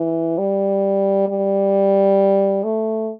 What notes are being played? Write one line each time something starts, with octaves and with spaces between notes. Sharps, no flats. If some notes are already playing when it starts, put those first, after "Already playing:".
Already playing: E3
G3
G3
A3